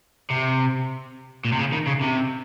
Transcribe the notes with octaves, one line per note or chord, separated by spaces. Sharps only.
C3
A#2
C3
C#3
D#3
C#3
C3